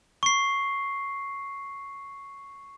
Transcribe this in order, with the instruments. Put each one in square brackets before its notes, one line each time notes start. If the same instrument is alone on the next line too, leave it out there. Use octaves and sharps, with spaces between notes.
[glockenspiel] C#6 C7